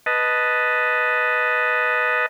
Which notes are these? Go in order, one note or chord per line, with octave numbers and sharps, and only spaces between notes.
B4 D#5 A5